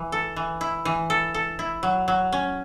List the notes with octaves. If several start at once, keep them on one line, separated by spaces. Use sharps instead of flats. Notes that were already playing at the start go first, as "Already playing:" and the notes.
Already playing: E3
A4
E3
E4
E3
A4
A4
E4
F#3
F#3
C#4